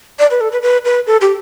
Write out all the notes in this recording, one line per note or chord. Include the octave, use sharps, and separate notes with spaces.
D5
B4
A4
B4
B4
B4
A4
G4